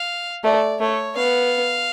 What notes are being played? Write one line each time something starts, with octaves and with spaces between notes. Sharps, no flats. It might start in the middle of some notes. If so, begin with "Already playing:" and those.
Already playing: F5
A3 D5
A3 C#5
B3 F5